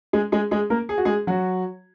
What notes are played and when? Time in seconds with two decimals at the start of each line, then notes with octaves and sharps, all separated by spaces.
0.13 G#3 G#4
0.32 G#3 G#4
0.51 G#3 G#4
0.70 A#3 A#4
0.89 G#4
0.98 F#4
1.05 G#3 G#4
1.27 F#3 F#4